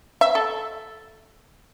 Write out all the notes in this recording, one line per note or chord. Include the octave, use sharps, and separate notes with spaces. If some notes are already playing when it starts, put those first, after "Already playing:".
E5
A4